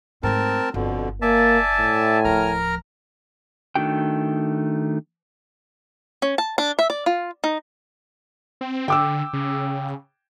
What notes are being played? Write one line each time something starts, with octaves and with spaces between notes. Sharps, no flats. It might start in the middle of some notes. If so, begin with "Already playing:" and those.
G#2 A3 C4 A#4 A5
G1 F2 B2 D3
A#3 D5 E5 G#5 A5
A2
D1 F3 A#4 A#5 F6
D#3 A3 D4 F#4 G5
C#4
A5
D4
E5
D5
F4
D#4
C4
D3 G5 D6 E6
C#3